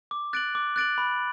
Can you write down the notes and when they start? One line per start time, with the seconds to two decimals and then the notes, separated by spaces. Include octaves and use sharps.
0.11 D6
0.33 F#6 A6 D7 F#7
0.55 D6
0.76 F#6 A6 D7 F#7
0.98 B5